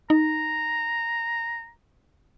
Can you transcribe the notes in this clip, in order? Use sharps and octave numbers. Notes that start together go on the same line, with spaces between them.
D#4 A#5